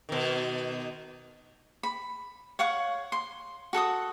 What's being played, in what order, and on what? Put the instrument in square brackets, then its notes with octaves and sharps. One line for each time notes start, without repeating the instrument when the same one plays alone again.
[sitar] B2 D#3
[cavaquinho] B5
C#5 F5 F#5 C#6
C6
F#4 A4 F#5 D#6